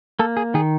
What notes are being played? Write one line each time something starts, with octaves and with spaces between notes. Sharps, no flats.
A#3 A4
G#4
D#3 G#4